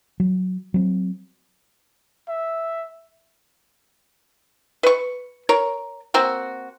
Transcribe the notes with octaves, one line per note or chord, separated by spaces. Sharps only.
F#3
F#3 C4
E5
B4 C#6
A#4 C#5
A#3 C4 F#4